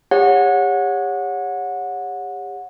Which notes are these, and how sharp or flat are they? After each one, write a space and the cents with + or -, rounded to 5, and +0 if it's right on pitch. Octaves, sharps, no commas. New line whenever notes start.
G4 +35 C#5 +0 F#5 -25